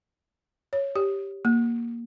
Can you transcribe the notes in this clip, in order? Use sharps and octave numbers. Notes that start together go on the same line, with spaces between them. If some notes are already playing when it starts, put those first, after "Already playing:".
C#5
G4
A#3